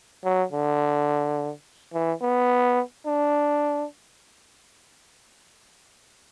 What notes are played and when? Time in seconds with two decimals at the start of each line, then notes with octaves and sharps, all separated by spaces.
0.24 F#3
0.52 D3
1.93 E3
2.21 B3
3.06 D4